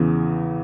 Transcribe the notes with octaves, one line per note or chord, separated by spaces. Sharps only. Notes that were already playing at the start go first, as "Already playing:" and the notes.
Already playing: E2 C#3 E3